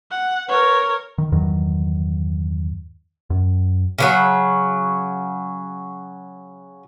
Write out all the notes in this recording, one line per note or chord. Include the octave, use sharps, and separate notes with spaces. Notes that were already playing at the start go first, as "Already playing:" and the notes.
F#5
A#4 B4 C#5
D#3
E2 G2 D#3 F#3
F#2
C#3 F3 F#3